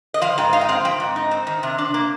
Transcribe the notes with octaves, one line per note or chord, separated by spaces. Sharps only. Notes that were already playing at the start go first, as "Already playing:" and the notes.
D#5
F3 F5
G#2 G5
D#4 F5
G5
C4 F5
F3 G5
G#2
D#4
C4
D#3
C3
D4
A#3